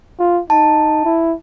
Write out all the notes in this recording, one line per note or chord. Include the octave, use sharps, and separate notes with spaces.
F4
D#4 A5
E4